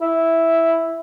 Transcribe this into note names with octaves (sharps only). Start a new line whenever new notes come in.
E4